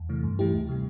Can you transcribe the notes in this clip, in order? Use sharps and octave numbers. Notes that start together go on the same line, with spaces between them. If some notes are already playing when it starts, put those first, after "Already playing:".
Already playing: E2
C3 E3 A3
G2
E3 A3 E4 G4
D2
C3 G3